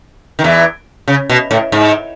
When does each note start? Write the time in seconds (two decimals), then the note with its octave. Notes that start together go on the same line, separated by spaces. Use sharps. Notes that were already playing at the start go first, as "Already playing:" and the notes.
0.39 D#3
0.44 E2 E3
1.08 C#3
1.30 B2
1.51 A2
1.72 G#2